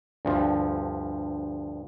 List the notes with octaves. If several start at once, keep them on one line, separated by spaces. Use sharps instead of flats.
D2 G2 F3